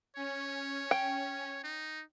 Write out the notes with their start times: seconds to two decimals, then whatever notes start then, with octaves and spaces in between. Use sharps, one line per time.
0.16 C#4 C#5
0.91 G5
1.64 D#4